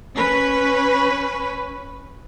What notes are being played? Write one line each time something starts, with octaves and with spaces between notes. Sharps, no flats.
C#4 B4